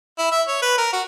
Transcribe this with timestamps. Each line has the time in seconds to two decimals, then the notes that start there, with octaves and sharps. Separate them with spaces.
0.18 E4
0.31 E5
0.48 C#5
0.62 B4
0.78 A#4
0.93 F#4